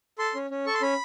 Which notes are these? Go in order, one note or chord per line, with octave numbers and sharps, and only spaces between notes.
A4 C6
C#4
C#4
A4 C#6
C6
C#4 B5